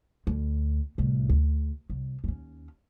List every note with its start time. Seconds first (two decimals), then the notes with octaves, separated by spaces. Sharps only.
0.27 D2
0.98 C2 A2
1.29 D2
1.90 C2
2.24 D#2 C#4